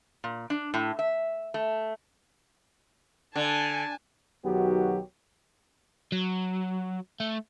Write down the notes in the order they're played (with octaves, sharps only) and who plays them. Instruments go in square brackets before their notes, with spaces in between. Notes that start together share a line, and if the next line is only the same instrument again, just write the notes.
[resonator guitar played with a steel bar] A#2
D4
A2
E5
A3
[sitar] D3 [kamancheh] G#5 A5
[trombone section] B1 D#3 F#3 B3 F#4 G4
[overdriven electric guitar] F#3
A3